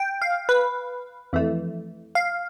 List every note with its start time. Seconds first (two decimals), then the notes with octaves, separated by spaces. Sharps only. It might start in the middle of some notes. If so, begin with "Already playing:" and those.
Already playing: G5
0.22 F5
0.49 B4
1.33 F2 E3 A3
2.15 F5